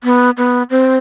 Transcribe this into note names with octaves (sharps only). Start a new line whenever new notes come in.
B3
B3
C4